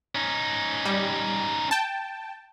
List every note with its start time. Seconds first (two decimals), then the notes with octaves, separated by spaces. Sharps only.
0.15 C#4 D#4
0.85 G3
1.71 G5 A5